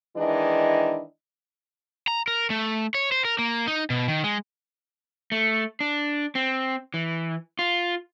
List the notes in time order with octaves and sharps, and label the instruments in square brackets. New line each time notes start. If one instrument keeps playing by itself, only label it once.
[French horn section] D#3 E3 G#3 D4 E4 D#5
[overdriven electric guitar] A#5
A#4
A3
C#5
C5
A#4
A#3
D#4
B2
D#3
G#3
[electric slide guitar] A3
D4
C4
E3
F4